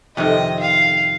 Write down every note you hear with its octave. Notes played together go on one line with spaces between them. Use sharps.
F2 C3 D#3 C4 D#5
F5